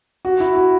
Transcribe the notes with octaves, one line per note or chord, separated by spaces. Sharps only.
F#4
E4
F#4